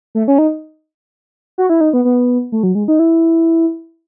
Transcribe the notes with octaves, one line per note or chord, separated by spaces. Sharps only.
A3
C#4
D#4
F#4
E4
D#4
B3
B3
A3
F#3
G#3
D#4
E4